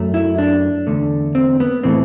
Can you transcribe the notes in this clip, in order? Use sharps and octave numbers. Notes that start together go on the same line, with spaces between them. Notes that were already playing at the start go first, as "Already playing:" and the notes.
Already playing: F#2 F#3 A3
E4
D4
E2 D3 A3
C4
B3
A2 E3 A3 C4